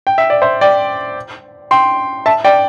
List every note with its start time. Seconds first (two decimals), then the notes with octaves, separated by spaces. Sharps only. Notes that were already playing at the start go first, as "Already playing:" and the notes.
0.07 G5
0.18 E5
0.30 D5
0.42 C5 E5
0.61 D5 G5
1.71 G5 C6
2.26 E5 A5
2.44 D5 G5